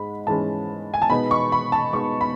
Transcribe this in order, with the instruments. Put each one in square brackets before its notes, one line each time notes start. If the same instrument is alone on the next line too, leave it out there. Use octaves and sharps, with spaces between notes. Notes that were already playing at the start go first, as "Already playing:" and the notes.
Already playing: [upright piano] G#2 G#3 B5
G#2 E3 G#3 C#4 A5
G#5
A5
B2 G#3 B3 D#4 B5
C#6
B5
A5
B2 G#3 B3 D#4 C#6
B5